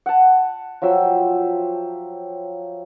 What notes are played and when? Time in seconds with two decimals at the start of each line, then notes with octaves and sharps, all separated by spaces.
0.06 F#5 A5
0.82 F3 F#3 E5 G5